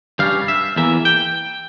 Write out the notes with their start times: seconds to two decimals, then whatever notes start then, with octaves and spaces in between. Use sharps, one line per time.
0.19 G2 G3 C#4 F5
0.48 E5
0.76 E2 E3 A#3 E5
1.05 G5